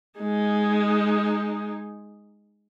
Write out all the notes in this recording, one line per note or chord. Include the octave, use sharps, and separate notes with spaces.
G#3 D#4